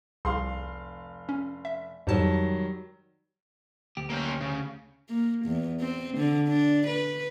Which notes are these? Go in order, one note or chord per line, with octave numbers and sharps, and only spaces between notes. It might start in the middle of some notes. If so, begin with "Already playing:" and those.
F1 C2 G#4 F5 C6
C#4
E5
F2 G#2 D#3 F#3 G3 A5
D2 G4
A#3 C#4 G5
C#3
A#3
E2
C4
D3
D4
B4